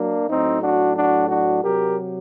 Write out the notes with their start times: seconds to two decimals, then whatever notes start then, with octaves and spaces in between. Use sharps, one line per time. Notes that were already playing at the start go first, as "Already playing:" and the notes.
Already playing: F#3 A#3 D4
0.29 A2 F#3 C4 D#4
0.61 D4 F#4
0.95 D4 F#4
1.29 D4 F#4
1.62 C3 F#3 G4 A#4